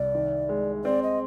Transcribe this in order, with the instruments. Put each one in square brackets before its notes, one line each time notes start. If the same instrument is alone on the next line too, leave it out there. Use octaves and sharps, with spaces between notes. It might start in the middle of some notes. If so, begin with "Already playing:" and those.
Already playing: [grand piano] C2 [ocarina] D5
[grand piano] D#3
G#3
[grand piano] C4 [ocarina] D5
[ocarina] D#5